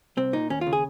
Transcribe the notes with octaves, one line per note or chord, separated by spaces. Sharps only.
C2 C4
A#2 D#4
D#2 C#4
F4
C#3
G#4